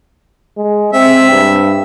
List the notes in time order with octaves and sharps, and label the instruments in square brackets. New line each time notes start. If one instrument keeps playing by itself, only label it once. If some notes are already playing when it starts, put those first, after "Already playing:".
[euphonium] G#3
[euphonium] C4 [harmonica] E5
[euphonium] G2